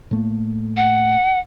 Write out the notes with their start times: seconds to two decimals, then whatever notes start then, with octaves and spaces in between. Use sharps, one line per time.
0.11 A2 A3 A#3
0.77 F#5